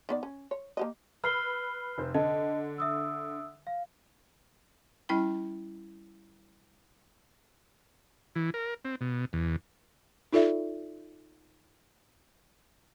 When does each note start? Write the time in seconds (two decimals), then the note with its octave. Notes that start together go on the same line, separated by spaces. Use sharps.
0.09 D#3 B3 D5
0.23 C#4
0.51 C#5
0.77 A#3 G4 D#5
1.24 B4 B5 E6 F6 C7 G7
1.98 F1 C5
2.14 D3 D#5 A5
2.78 E5 D#6 E6
3.67 F5
5.09 G3 C#4 E4 G5 B5
8.36 E3
8.54 A#4
8.85 C4
9.01 B2
9.33 E2
10.33 D#4 F4 A4 D5 E5